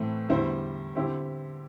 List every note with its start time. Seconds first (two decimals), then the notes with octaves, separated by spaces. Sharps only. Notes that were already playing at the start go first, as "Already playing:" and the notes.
Already playing: A2 E3 A3 C4
0.29 E2 D3 G3 E4 C5
0.95 D3 C4 E4 G4